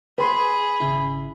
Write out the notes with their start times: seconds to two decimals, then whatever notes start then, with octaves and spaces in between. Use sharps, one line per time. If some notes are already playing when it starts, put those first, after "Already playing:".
0.18 G#4 B4 B5 C6
0.80 G#1 C#3 E4